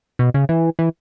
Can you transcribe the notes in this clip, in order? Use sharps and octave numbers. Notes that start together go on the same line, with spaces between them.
B2
C#3
E3
E3